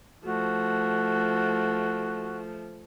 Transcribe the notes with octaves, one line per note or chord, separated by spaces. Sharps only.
F3 A3 F#4